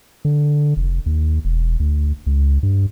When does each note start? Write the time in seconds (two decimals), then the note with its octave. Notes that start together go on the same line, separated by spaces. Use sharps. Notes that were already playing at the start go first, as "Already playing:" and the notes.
0.25 D3
0.77 F1
1.06 D#2
1.45 E1
1.80 D2
2.27 C#2
2.63 G2